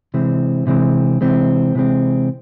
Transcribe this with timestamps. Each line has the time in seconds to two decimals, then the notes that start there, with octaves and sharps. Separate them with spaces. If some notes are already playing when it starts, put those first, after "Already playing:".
0.14 C3 E3 G#3 C4
0.67 C3 E3 G#3 C4
1.21 C3 E3 G#3 C4
1.75 C3 E3 G#3 C4